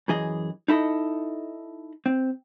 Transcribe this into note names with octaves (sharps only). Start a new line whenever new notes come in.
F#2 E3 G#4 D#5
D#4 E4 A4 D#5
C4